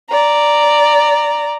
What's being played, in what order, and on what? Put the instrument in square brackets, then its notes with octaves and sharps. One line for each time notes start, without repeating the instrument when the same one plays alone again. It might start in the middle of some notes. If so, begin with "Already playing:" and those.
[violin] D5 A#5